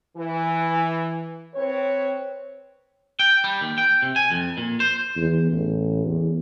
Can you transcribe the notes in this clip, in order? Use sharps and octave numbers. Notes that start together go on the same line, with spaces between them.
E3
C4 B4 C#5
G5
G3
D#2
G5
C3
G#5
F2
A#2
C5
E2
A1
E2